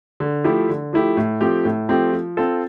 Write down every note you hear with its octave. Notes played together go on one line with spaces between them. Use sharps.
D3
F3 A3 E4 G4
D3
F3 A3 E4 G4
A2
F3 A3 C4 G4
A2
F3 A3 C4 G4
F3
C4 F4 A4